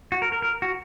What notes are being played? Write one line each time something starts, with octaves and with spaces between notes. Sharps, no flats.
F#4
A#4
A#4
A#4
F#4